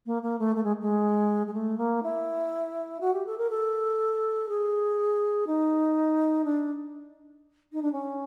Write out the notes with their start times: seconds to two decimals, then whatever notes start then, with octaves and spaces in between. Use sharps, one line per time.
0.06 A#3
0.23 A#3
0.39 A3
0.56 A3
0.64 G#3
0.81 G#3
1.47 G#3
1.54 A3
1.78 A#3
2.03 E4
3.01 F#4
3.13 G4
3.26 A4
3.38 A#4
3.50 A4
4.49 G#4
5.47 D#4
6.45 D4
7.73 D#4
7.82 D4
7.92 C#4